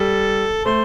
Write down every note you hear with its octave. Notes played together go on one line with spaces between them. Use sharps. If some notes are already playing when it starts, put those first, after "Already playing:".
Already playing: G3 A4
A3 C5